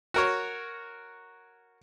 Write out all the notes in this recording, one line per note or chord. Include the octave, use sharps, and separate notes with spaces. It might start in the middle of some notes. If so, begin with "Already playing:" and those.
F#4 A#4 C#5